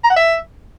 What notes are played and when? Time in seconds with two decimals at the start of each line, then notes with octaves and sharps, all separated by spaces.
0.04 A#5
0.10 F#5
0.16 E5